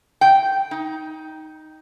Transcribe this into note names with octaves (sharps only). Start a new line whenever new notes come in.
G5
D#4